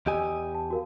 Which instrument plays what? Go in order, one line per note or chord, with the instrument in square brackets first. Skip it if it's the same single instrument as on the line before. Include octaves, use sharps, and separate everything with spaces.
[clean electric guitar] E2 G4 G#5 [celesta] D#5 D#6 E6
[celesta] A5
F#4 A#4 F5